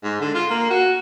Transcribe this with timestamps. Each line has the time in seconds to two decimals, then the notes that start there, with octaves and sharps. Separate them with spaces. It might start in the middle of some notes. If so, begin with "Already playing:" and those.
0.03 G#2
0.21 D3
0.35 F4
0.50 A#3
0.70 F#4